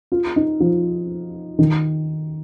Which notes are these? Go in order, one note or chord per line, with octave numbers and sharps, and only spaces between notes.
F4
D#4
F3
D#3